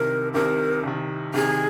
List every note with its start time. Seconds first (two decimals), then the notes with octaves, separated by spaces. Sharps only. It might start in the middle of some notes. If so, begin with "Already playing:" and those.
Already playing: C2 C3 D#3 A#4
0.34 C2 C3 D#3 A#4
0.83 C2 C3 D#3
1.34 C2 C3 D#3 G#4